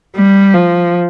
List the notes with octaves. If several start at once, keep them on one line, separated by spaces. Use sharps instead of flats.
G3
F3